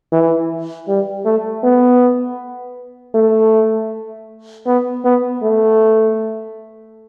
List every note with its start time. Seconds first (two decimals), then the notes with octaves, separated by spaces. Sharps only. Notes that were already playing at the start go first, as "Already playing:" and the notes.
0.12 E3
0.88 G3
1.25 A3
1.63 B3
3.14 A3
4.66 B3
5.05 B3
5.42 A3